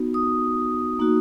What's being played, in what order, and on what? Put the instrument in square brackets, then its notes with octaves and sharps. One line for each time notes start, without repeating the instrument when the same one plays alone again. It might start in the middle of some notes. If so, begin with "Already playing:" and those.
Already playing: [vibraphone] B3 D#4 F#4
D#6
A#3 D#4 F#4